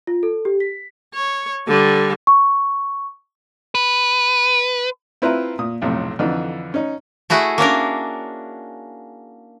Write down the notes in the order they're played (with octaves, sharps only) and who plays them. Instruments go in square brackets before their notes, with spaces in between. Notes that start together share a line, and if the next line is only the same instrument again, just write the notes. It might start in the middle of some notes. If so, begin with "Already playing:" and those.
[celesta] F4
A4
G4
B6
[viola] C#5
D3 G3
[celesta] C#6
[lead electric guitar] B4
[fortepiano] C4 E4 F4 B4 E5 A#5
A#2 D#6
B1 F2 A2 C3
F2 D3 E3 D#4
C#4 D#4
[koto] A3 E4 F#4 G#4 F#5
A#3 C#4 D4 A#4